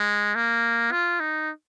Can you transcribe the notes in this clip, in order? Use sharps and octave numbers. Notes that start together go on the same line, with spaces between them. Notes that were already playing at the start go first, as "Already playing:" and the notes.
Already playing: G#3
A#3
F4
D#4